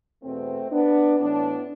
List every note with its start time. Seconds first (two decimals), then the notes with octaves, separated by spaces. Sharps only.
0.23 E2 B2 A3 C4
0.72 B3 D4
1.19 A2 E3 B3 D4